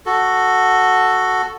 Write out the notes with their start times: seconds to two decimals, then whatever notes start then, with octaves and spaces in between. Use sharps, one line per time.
0.06 F#4 A4